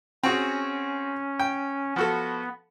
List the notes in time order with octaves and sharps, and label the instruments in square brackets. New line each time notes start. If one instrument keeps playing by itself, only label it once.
[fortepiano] C4 F#4 G#4 [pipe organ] C#4
[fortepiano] G5
[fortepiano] F3 F#4 A4 [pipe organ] B3